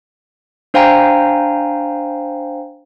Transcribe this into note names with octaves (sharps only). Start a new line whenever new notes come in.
D4 C5 F5 G5 G#5 A#5